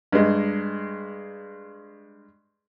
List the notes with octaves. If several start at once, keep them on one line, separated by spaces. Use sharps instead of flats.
G2 G#3